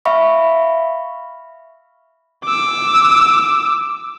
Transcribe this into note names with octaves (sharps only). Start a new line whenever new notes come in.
E5 F5 B5 C#6
D6 E6